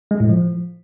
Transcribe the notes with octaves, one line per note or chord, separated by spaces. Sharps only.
G#3
A2
F3